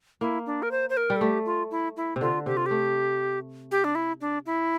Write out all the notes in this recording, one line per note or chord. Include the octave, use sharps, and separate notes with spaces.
A#3 E4
D4
A#4
C5
C5
A#4
G3
A4
A3 G4
F4
E4
E4
C3
D3 F4
C3 G4
F4
A3 G4
G4
D4
E4
D4
E4